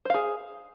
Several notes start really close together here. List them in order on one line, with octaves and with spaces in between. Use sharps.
C5 F5 G#4